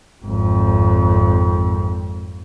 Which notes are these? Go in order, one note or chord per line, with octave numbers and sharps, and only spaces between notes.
G#1 F2